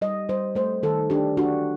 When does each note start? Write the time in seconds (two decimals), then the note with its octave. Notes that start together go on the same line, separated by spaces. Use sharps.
0.01 G3 D#5
0.29 G3 C5
0.55 A3 C5
0.83 D#3 A4
1.10 D4 G4
1.37 D4 F#4